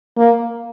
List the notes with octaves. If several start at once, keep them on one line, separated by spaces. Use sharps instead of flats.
A#3